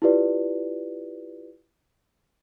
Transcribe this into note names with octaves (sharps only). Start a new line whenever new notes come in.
E4 F4 G4 B4 D5